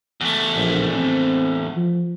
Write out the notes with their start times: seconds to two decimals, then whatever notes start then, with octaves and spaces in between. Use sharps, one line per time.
0.21 E2 A3
0.56 A#1
0.96 C4
1.76 F3